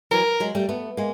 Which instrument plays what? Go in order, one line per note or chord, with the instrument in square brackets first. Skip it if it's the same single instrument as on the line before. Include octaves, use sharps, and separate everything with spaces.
[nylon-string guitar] E3 F#3 [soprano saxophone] A#4
[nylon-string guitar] F#3 G#3
G3 A3
A3 B3
G#3 A#3